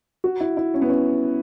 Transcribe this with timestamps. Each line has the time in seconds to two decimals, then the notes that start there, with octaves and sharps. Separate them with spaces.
0.24 F#4
0.40 E4
0.57 E4
0.74 C#4
0.82 B3
0.89 C#4